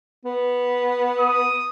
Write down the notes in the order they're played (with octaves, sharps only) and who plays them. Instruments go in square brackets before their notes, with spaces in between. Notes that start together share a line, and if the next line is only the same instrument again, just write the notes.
[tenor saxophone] B3
[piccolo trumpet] D#6